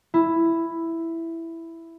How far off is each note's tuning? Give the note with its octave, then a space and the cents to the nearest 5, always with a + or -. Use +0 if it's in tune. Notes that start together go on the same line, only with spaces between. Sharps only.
E4 +5